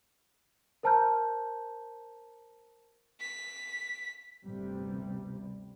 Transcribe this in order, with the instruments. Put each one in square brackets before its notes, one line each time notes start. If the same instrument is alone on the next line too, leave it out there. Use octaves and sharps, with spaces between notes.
[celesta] A#4 C5 A5 A#5 F6 G6
[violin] B6
[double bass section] G1 D2 C3 G3